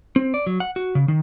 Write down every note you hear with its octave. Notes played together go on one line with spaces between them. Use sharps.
C4
D5
F#3
F#5
F#4
C#3
D#3